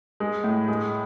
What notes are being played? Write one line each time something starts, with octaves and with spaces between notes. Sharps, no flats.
G#3
A2
G#3